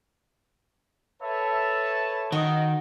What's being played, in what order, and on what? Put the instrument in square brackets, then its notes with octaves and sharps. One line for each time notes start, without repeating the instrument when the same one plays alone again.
[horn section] A4 C#5 E5 [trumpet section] B4 A5
[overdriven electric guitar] D#3 [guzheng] F#4 [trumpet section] D#5